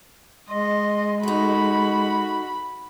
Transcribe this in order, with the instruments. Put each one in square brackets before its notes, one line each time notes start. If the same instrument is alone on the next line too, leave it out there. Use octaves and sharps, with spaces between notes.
[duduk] G#3 [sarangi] D#5 [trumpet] C6
[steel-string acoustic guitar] A3 D#4 [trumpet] F#4 [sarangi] B5